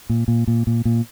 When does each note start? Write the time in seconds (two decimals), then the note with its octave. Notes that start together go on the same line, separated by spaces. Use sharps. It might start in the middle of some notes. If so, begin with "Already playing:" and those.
0.09 A#2
0.28 A#2
0.47 A#2
0.67 A#2
0.85 A#2